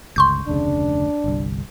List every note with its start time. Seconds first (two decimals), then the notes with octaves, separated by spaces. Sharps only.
0.16 G1 C#2 C6 C#6 G6
0.47 F1 D2 C#3 D4
1.24 G1 C2